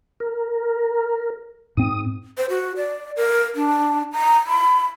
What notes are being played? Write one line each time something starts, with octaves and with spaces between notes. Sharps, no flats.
A#4
G#2 C4 D#6
C5
F#4
D5
A#4
D4
A#5
B5